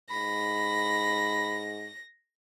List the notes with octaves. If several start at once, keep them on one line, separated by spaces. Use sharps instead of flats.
G#2 B5 A#6